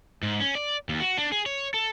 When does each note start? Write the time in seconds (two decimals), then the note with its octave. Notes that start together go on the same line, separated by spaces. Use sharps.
0.23 G#2
0.40 C#4
0.55 D5
0.89 D#2
1.00 F#4
1.18 D4
1.32 G#4
1.46 C#5
1.74 A4